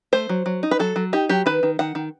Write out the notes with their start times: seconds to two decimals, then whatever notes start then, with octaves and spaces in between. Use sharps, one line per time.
0.13 A3 C5
0.29 F#3
0.46 F#3
0.63 D#4
0.71 B4
0.79 F#3 A4
0.96 F#3
1.13 D#4 G4
1.29 F#3 G4
1.46 D#3 B4
1.63 D#3
1.79 D#3 F#5
1.95 D#3